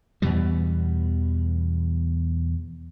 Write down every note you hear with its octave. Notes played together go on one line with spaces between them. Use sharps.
E2 B2 E3 G3